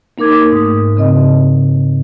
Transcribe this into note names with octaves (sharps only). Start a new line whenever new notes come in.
A#3 D#4 A#4 D6 G#6
G#2 A3 D#6
C#3 C4 D#5